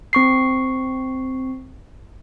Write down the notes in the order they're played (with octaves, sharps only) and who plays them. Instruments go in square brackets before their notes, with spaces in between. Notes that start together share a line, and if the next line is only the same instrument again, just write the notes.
[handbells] C4 C#6 C7